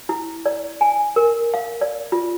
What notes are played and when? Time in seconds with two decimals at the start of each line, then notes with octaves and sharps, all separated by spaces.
0.09 E4
0.46 D5
0.81 G#5
1.16 A#4
1.54 F5
1.81 D5
2.12 F4